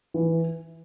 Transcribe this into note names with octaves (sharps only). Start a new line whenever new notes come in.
E3